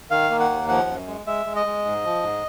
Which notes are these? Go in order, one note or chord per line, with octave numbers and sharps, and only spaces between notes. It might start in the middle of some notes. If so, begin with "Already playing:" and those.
D#3 F5
A#3
F#5
D#2
F3 F#5
F#2
G#3
G#3 E5
G#3
D#5
G#3
G#2
F3
G#2